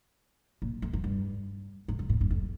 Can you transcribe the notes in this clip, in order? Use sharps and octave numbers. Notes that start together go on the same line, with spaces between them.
A#2
F2
F#2
G2
G#2
G#2
A#2
G2
F2